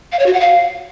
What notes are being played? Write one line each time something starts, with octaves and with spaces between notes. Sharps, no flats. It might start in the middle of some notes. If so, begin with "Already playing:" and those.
F5
C#5
F#4
F#5
F5